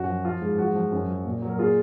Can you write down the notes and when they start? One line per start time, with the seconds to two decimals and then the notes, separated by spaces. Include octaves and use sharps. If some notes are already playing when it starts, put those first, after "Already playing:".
Already playing: F#2 F#4
0.08 F3
0.25 F3 F4
0.41 G#2
0.58 F3 F#4
0.75 F3
0.92 F#2
1.08 F3
1.25 A#2
1.42 F#3
1.49 A#4
1.59 A#2 F4 G#4